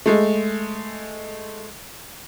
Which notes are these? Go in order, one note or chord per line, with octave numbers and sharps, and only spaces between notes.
G#3 A3